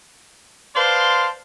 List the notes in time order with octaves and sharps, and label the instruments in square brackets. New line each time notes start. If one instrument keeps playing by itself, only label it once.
[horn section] B4 C5 D5 F5 A5 C6